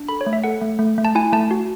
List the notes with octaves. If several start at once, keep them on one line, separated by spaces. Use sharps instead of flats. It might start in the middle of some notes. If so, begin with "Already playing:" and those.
Already playing: D4
A4 B5
C#5
A3
E5
A4 F#5
A3
A3
A3
A5
E4 G#5
A3 A5
F#4